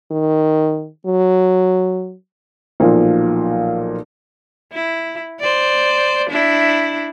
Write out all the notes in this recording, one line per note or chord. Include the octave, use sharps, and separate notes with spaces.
D#3
F#3
B1 A#2 F3 F4
E4
C5 D5
D4 E4